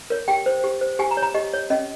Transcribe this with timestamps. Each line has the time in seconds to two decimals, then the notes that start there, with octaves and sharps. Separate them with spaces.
0.10 A#4 C#5
0.28 G4 G5
0.46 C5
0.64 G4
0.81 C5
0.99 G4 G#5
1.11 A#5
1.17 C#5
1.23 A#5
1.34 G4 D#5
1.53 C#5
1.70 C#4 D#5